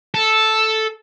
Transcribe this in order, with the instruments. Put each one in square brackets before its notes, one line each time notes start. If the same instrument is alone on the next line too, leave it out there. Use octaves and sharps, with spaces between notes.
[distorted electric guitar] A4